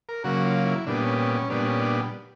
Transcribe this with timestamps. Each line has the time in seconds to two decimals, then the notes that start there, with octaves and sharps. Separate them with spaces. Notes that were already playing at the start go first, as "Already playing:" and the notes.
0.09 A#4
0.24 C#3 F#3 A#3 F#4
0.45 F4
0.66 E4
0.87 A#2 G3 B3 D4
1.02 C#4
1.18 C#4
1.34 C#4
1.50 A#2 G3 B3 D4
1.66 C#4
1.82 D4